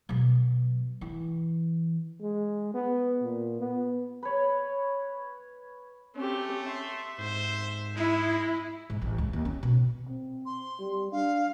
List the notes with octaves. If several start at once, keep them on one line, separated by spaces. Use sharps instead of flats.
B2 F#3
E3
G#3
B3
A#2
B3
B4 C#5
A3 C4 C#4 G4
E5 C6
G#2 C5
G#3 E4
G#2
A1
C#2
D#2
C#4
B2
C4
C6
G3
D4 F5